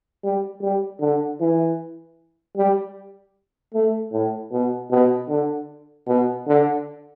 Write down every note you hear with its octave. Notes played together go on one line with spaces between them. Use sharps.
G3
G3
D3
E3
G3
A3
A2
B2
B2
D3
B2
D3